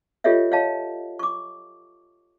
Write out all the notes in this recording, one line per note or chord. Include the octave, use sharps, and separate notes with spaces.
F4 G4 A4 C#5 D#5 E5
C#5 D#5 F5 A5
C#6 D6